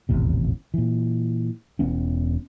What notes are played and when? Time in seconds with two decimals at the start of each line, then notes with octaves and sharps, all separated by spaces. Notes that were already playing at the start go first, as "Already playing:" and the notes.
0.09 D#1 A1 E2 C3
0.74 A#2 E3
1.79 E1 E2 B3 C#4